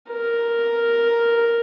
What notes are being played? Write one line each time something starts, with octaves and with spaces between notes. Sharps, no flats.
A#4